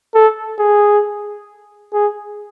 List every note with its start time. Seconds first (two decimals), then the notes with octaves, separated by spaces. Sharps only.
0.14 A4
0.59 G#4
1.93 G#4